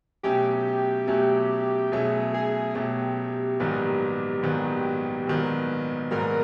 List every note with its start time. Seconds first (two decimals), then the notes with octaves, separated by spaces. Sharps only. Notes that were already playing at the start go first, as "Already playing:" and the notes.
0.23 B2 F#3 A3 C#4 G4
1.08 B2 F#3 A3 C#4
1.92 B2 F#3 A3 C#4 G#4
2.34 G#4
2.75 B2 F#3 A3 C#4 G4
3.60 A#1 G#2 D#3 F#3 B3
4.43 A#1 G#2 D#3 F#3 B3
5.27 A#1 G#2 D#3 F#3 B3
6.11 A#1 G#2 D#3 F#3 B3 A#4